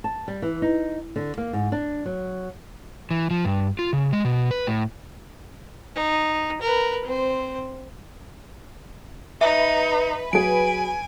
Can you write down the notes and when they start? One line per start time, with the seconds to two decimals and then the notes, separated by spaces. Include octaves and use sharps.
0.04 A5
0.28 G3
0.42 E3
0.62 D#4
1.16 D3
1.37 A#3
1.53 G#2
1.72 D4
2.05 F#3
3.11 E3
3.31 F3
3.45 G2
3.79 F4
3.93 C#3
4.13 G#3
4.25 B2
4.51 B4
4.67 A2
5.95 D#4
6.61 A#4 B4
7.05 C4 C5
9.41 D#4 B4 E5
10.33 F#3 G#4 G#5 D7